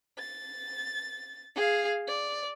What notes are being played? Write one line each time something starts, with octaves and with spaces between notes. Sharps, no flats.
A6
G#4 F5
D5